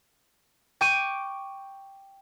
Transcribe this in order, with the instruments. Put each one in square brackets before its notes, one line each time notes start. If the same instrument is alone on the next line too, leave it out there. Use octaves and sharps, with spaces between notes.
[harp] G5 C#6 D6 D7 D#7